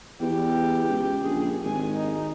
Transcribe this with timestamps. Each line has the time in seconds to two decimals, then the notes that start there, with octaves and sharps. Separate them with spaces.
0.21 E2 G4
0.90 C#2
1.24 A#1 G#4
1.63 G#1 G#5
1.97 D#4